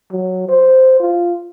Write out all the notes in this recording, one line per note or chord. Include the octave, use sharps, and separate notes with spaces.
F#3
C5
F4